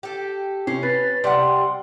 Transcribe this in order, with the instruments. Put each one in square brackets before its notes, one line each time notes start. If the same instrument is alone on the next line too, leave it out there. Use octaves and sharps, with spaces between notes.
[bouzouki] G4 A4
[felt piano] C3 [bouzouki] C#4 [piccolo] C7
[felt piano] B4 [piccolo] A6
[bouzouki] C3 G3 F#5 [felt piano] D5 [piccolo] C6